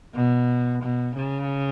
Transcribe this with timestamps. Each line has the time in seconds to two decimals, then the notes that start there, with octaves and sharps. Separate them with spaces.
0.14 B2
0.82 B2
1.16 C#3